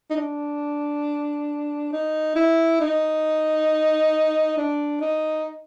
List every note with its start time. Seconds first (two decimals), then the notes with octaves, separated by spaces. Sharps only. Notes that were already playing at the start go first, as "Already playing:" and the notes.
0.10 D#4
0.16 D4
1.93 D#4
2.36 E4
2.81 D#4
4.57 D4
5.01 D#4